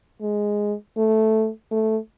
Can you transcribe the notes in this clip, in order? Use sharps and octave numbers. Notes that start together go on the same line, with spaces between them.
G#3
A3
A3